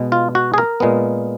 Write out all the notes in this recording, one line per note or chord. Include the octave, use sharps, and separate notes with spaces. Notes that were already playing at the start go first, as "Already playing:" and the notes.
Already playing: B2 G#3 B3
F4
F#4
G#4
A#4
A#2 G#3 B3